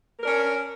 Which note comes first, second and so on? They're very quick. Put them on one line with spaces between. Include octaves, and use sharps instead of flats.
A#4 D4 C#4